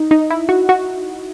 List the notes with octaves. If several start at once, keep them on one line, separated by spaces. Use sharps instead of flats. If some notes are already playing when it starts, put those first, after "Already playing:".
Already playing: D#4
D#4
E4
F#4
F#4